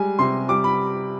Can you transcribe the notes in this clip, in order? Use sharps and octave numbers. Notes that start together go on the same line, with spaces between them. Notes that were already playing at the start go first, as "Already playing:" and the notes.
Already playing: G3 G#3 G#5
C3 C6
G3 D6
B5